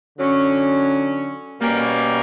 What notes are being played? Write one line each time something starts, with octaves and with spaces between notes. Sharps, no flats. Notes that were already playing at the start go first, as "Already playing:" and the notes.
D3 F#3 C#4
B2 G3 A#3 C#4